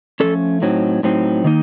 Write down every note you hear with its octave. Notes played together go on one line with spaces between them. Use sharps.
F3 A3 C#4 A4
A2 F#3 C4 D#4
A2 F#3 C4 D#4
D#3 A#3 D#4